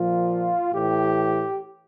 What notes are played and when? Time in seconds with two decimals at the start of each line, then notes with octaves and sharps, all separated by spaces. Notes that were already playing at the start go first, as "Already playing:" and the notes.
Already playing: A#2 F3 F4
0.74 A2 E3 G4